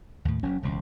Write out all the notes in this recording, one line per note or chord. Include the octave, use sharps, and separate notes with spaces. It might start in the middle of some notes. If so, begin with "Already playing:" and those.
D#2 A2
F#1 F#3 C#4
E1 C#2